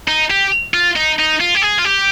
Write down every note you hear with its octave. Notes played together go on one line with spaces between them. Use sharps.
D#4
G4
F4
D#4
D#4
F4
G4
G#4
F4
G4